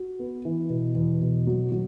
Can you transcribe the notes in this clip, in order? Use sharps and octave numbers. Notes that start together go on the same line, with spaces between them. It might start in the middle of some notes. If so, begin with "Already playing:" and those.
Already playing: F#4
B3
E3
B2
E2
B2
F#3
F#3